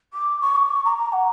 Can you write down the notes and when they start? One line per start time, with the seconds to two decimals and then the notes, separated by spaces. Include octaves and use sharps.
0.13 D6
0.41 C#6
0.56 D6
0.70 C#6
0.85 A#5
0.98 A#5
1.13 F#5